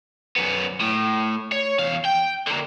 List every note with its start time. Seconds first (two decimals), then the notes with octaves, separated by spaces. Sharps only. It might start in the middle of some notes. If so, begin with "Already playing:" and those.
0.36 F#2 B3
0.81 A2
1.52 C#5
1.79 E2 F5
2.05 G5
2.47 D3 A#3